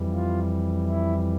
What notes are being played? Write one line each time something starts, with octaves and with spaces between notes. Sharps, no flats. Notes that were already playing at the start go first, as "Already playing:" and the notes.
Already playing: F2 E3 G3
F4
E4